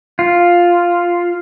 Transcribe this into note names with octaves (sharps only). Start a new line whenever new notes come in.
F4